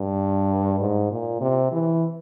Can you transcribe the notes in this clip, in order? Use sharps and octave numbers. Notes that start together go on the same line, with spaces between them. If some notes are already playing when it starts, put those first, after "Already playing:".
Already playing: G2
G#2
A#2
C3
E3